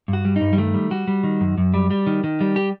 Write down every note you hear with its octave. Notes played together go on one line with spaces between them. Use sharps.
G2
F#4
G3
D#4
G2
G3
D#3 A3
G3
G3 F#4
G3
D#3
F#2
F#2
G3
G3
D#3
D#3
G3
G4